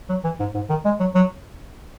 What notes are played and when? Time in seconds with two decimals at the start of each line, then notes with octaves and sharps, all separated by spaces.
0.09 F#3
0.24 E3
0.39 G#2
0.54 G#2
0.69 D#3
0.85 G#3
1.00 F#3
1.15 F#3